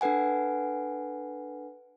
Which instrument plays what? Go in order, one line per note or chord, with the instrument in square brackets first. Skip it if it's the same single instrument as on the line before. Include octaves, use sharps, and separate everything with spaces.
[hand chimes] D4 A4 B4 F#5 G#5